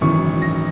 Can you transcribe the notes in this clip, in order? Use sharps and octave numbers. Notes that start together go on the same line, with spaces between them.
G#1 F#2 C#3 E3 C#6
A#6